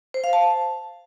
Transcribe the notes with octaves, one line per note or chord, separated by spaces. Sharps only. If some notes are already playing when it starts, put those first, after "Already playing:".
C5
F5
A5